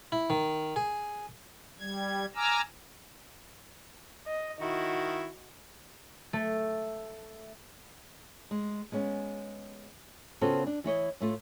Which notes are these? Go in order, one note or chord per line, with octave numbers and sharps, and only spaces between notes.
E4
D#3
G#4
G3 G#6
G#5 A#5 D6 E6 F6
D#5
D#3 E4 F#4
A3
G#3
G#3 B3 C#4
C#3 B3 C4 F4 F#4 A4
D4
E3 E4 C#5 D#5
A2 A3 F4